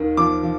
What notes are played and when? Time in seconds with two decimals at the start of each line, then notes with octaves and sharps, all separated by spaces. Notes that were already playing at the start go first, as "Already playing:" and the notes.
Already playing: D#2 D#3
0.17 F3 D6
0.43 F3